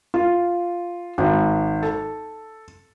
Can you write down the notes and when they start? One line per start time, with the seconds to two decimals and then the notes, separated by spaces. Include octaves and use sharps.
0.14 F4
1.18 G#1
1.83 A4